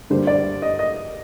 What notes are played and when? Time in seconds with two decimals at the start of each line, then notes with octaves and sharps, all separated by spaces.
0.10 G2 D3 G3 A#3 C5
0.27 D5
0.62 D#5
0.79 D#5